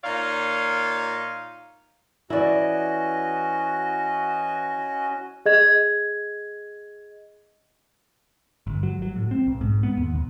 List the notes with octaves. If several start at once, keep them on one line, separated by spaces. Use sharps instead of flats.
A#2 D#4 F4 C#5 D5 F5
E3 C#4 E4 F#4 D5 D#5
G#4 D#5 G#6
G1
F#3
F#3
A2
C4
B1
G#2
B3
D#2
B1